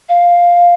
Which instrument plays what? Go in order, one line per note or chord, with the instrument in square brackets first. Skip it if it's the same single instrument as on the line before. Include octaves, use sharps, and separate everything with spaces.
[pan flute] F5